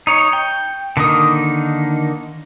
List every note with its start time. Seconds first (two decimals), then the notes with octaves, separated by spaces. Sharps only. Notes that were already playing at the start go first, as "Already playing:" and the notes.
0.07 D#4 C#5
0.33 G5
0.97 D3 D#3 A#3 D#4 D#6